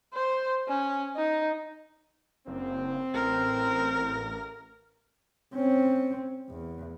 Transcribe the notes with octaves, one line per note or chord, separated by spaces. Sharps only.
C5
C#4
D#4
F#1 C4
A1 A#4
C4 C#4
E2